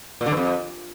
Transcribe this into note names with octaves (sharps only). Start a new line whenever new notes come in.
A#2
D3
G2
F2